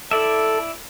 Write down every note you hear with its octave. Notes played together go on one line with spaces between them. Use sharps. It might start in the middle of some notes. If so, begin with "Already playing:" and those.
E4 A4 D5 E5